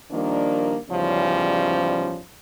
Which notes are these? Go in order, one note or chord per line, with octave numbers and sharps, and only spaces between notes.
D#3 F3 G3 A#3 D4
E2 G#2 C#3 F3 G3 C#4